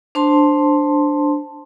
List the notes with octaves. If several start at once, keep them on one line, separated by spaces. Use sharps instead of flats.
D4 C5 A5 C6